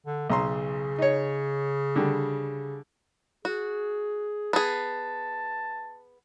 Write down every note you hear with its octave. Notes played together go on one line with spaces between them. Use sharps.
D3
B1 C#3 A#5 C6
D#4 C#5
D3 G3
F#4 G#4
B3 G#4 A5